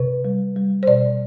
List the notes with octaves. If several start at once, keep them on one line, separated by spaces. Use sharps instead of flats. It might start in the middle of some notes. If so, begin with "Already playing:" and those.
Already playing: C3 B4
G3
G3
C5
B2 D5